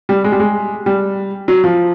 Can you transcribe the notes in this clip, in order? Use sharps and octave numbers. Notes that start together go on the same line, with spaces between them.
G3
G#3
G3
G#3
G3
F#3
F3